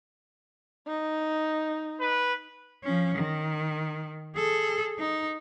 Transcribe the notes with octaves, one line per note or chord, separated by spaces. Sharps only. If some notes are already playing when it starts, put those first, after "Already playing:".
D#4
B4
F3 C#4
D#3
G#4 A4
D#4